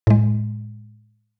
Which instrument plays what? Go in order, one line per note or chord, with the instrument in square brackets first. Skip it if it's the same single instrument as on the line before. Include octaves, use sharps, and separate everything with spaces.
[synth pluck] A2 G#3